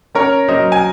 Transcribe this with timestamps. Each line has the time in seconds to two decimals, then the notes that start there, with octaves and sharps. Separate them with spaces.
0.15 C#4 A#4 C#5
0.48 F#3 C5 D#5
0.72 G#5